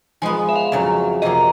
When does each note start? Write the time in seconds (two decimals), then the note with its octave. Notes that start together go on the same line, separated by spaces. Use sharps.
0.22 F3 G#3 B3 G#5
0.49 E5
0.56 F5
0.72 F2 C#3 F#3
1.22 F2 C3 F3 A#3 D#5